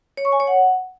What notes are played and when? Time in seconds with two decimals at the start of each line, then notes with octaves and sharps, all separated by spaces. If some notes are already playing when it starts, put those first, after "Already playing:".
0.17 C#5
0.25 C#6
0.32 G#5
0.40 C#5
0.47 F#5